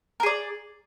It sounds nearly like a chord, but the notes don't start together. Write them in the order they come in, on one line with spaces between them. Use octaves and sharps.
A#4 G#4 D5